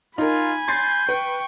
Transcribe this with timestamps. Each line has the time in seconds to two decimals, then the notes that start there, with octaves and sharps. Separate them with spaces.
0.18 D#4 F4 A#4 G#5 B5
0.68 C6 G6 A6 C7
1.09 B4 G5 C#6